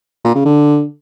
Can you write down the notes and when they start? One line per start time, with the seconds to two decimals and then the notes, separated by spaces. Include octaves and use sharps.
0.24 A#2
0.35 C#3
0.45 D3